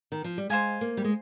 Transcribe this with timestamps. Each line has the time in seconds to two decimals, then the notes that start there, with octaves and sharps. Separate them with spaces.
0.12 D#3
0.24 F3
0.38 G3
0.50 G#3 C5 F5 G#5
0.81 A#3
0.97 G3
1.04 G#3